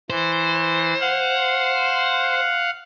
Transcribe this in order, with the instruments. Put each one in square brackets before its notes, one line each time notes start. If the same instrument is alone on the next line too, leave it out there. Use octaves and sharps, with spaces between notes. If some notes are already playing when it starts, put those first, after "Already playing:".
[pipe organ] E3 [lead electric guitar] C5
[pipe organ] F5 F#5